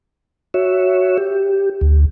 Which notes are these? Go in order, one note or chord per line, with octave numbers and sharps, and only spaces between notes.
F#4 C#5 E5
G4
D2